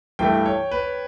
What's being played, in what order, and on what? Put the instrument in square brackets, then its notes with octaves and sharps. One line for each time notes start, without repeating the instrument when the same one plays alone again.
[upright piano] G2 E3 A3 [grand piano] G5
[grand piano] C#5
B4